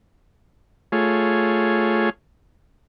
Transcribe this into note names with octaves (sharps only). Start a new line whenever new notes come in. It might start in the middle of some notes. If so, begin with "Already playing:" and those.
A3 F4 G#4 C#5